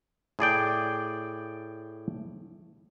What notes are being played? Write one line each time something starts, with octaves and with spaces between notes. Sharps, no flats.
A2 G#4 D5 G5